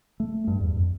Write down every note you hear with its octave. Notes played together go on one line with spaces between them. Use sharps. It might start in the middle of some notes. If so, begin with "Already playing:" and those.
A3
G2
E2
F2